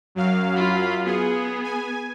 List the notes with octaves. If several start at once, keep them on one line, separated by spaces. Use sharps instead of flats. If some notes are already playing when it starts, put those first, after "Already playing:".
F#2 F#3 F5
F4 B5
B3 G#4
G#5